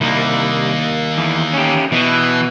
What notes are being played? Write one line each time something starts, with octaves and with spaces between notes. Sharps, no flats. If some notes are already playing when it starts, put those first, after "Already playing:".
C2 D#3 A#3
E2
C#4 G4
B2 E3